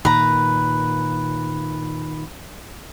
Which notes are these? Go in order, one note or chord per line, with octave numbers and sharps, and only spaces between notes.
A#2 D#3 B4 A#5